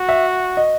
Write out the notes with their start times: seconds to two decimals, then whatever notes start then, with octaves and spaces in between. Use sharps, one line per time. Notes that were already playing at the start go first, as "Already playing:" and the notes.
Already playing: F#4
0.09 E5
0.57 D#5